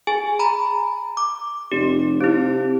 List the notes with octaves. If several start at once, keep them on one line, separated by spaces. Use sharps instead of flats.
G#4 G#5
A#5 B5
D6
F1 G4
C3 C4 E4